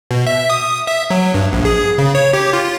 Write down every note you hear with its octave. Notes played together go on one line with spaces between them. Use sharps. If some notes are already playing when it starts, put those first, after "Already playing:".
B2
E5
D#6
E5
F#3
G2
A#1
G#4
C#3
C#5
G4
F4